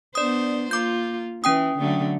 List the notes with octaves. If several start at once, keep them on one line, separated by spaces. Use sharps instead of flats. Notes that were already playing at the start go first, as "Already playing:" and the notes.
B3 D4 C5 D5 D#6
A#3 F4 D6 G6
E3 C#4 G5 D#6
D3 F#3 A3